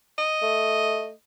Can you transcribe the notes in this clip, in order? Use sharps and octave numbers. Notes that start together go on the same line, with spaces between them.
D#5
A3